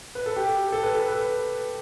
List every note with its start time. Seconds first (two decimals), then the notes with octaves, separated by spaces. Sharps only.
0.15 B4
0.26 A4
0.36 G4
0.72 A4
0.83 B4
0.94 A4
1.08 B4